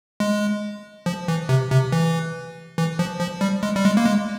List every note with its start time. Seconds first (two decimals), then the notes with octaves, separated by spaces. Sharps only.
0.20 G#3
1.06 F3
1.28 E3
1.49 C3
1.71 C3
1.92 E3
2.78 E3
2.99 F3
3.20 F3
3.41 G3
3.63 G#3
3.76 G3
3.85 G#3
3.97 A#3
4.06 G#3